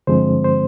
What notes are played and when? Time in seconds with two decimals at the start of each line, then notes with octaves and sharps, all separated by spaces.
0.07 G2 D3 F3 G#3 C4 C5
0.44 C5